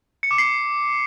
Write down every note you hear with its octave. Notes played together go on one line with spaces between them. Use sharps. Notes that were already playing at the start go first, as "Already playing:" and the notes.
C#7
D6
C7